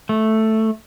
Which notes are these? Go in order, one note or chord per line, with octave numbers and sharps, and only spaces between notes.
A3